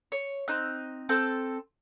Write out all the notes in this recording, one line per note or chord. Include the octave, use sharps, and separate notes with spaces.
C#5
C4 D#4 F#6
C4 A4 A5 G6